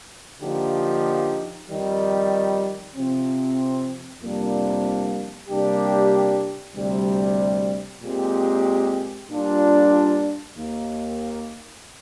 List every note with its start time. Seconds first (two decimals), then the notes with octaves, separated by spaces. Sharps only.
0.41 D3 F3 A#3 D#4 G4
1.68 F2 D#3 G3
2.96 C3 F3 C4
4.21 F2 C3 G3 A#3 D4
5.48 C3 G3 A#3 D4 G4
6.75 D2 C3 G3
8.03 A#2 G#3 C4 G4
9.29 A#2 G3 D4 F4
10.56 D#2 D#3 A#3